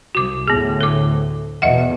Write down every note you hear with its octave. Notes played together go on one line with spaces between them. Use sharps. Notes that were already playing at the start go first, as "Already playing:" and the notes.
C2 F#4 D6
D2 A2 B3 G#4
A4 D6
E2 B2 D#5 E5 F#5